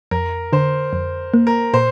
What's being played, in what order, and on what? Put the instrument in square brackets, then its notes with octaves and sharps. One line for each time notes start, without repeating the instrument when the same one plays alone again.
[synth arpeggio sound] F2 [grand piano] A#4
[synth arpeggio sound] D3 [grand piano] C5
[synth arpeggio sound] F2
A#3
[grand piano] A#4
[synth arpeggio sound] A#2 [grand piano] C5